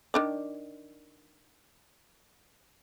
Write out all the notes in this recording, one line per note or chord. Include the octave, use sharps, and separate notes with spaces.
D#3 D4 D5